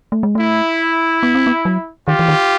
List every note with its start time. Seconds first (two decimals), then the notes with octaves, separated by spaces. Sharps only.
0.12 A3
0.23 G#3
0.35 A3 E4
1.23 B3
1.35 C4
1.47 B3
1.65 F#3
2.07 D#3 F4 G4
2.19 E3
2.28 D#3